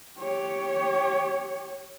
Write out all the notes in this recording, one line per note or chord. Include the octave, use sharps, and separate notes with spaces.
G4 C#5